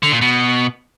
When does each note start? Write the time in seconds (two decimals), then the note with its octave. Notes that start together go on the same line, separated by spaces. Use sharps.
0.03 D3
0.12 A#2
0.21 B2